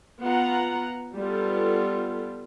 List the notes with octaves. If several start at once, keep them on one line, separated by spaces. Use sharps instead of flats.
B3 F4 F#5 A#5
G3 B3 F4 A4